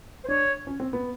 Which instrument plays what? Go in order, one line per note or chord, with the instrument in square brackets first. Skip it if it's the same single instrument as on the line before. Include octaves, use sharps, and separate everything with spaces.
[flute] C5
[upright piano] D4 [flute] C#5
[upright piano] C#4
C4
B3